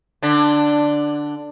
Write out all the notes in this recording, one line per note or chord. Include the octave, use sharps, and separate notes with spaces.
D3 D4